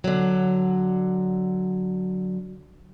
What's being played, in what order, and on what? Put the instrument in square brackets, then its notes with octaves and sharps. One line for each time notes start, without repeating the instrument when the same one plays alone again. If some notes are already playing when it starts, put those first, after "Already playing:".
[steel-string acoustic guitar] D3 F#3